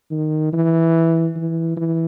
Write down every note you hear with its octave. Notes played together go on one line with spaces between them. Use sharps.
D#3
E3
E3
E3